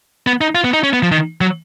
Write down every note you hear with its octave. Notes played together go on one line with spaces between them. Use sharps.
B3
D#4
F4
B3
D#4
C#4
B3
F3
D#3
F#3